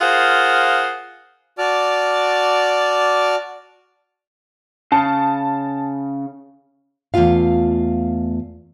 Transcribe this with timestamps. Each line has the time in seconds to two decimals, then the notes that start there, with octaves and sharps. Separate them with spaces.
0.01 F4 G#4 A#4 C5 F5 F#5
1.58 F#4 D5 A5 D6 F6
4.92 C#3 A5
7.14 E2 E3 A3 F4 F5